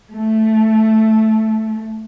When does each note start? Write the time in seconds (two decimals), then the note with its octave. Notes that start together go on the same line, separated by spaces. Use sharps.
0.13 A3